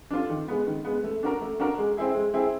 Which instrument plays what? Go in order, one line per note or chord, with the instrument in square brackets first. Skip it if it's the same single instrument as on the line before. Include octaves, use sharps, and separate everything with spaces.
[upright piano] D4 F4 A4
D#3
G#3 B3
D#3
G#3 B3
A3
D4 F#4 A#4
A3
D4 F#4 A#4
G#3
C4 E4 G#4
G#3
C4 E4 G#4